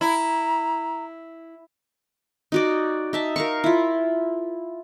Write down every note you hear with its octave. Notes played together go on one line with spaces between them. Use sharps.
E4 A#5
D#4 F#4 D5
D#4 E5 A5
A#4 F5 C#6
E4 F4